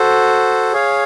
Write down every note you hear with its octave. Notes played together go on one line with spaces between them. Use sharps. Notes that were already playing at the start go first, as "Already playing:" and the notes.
Already playing: F#4 A4 C5
G#4 C#5 F5